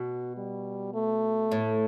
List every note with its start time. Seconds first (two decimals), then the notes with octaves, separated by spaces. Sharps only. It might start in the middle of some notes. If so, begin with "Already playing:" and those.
Already playing: B2 F#4
0.37 G3
0.94 A3
1.52 A2